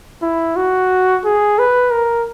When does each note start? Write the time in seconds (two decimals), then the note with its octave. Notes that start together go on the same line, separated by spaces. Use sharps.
0.22 E4
0.56 F#4
1.25 G#4
1.59 B4
1.92 A#4